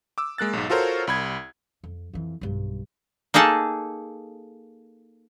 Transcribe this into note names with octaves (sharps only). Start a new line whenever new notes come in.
D6 E6
G#3 A#3 F#6 A6
B1 G#2
F4 F#4 A4 A#4 C5 C#5
C2 B5 G#6
F2
F2 E3
B1 G2
A#3 D#4 G#4 A4 A5